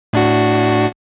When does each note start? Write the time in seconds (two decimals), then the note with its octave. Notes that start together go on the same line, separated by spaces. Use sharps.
0.13 A2 D4 F#4